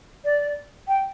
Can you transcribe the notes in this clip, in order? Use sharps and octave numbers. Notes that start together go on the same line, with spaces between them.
D5
G5